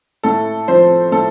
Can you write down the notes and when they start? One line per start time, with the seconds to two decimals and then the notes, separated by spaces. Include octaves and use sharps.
0.23 A2 A4
0.68 F3 C4 C5
1.12 A2 A4